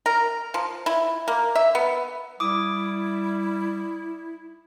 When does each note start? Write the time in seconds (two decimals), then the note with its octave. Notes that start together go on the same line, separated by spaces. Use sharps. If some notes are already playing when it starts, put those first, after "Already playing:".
0.06 A#4
0.54 F3
0.86 E4
1.28 A#3
1.55 E5
1.75 B3
2.40 G3 E4 D6 D#6